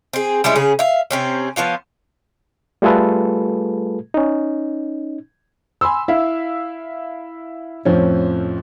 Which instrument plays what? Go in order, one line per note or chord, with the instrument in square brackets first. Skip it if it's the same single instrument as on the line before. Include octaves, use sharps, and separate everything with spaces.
[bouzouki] C4 G#4
G3 G#3 C#4 E4
C#3 C#4 G#4
E5 F5
C3 C4 C#4
F3 B3 F4 C#5
[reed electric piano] G3 A3 F4 G#4 A4 B4
C#4 D#4
[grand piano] G#5 B5 C6 E6
E4 E5 F5
F2 A2 F3 C4 C#4